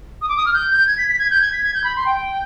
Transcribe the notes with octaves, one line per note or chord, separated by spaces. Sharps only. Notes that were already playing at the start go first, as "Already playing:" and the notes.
D#6
D6
D#6
F6
G6
G6
G#6
B6
B6
G#6
G6
G#6
B6
G#6
G6
B5
C6
G5